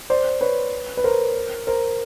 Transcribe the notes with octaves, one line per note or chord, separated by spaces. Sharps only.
C5 D5
B4 C#5
B4
A#4 C5
A#4 C5